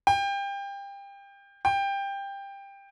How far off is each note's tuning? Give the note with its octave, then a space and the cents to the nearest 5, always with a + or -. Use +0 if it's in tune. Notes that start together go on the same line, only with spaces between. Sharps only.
G5 +25
G5 +15